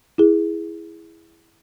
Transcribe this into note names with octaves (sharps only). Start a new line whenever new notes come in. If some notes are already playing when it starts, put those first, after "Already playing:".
E4 G#4